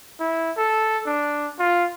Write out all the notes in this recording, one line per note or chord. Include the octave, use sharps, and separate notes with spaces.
E4
A4
D4
F4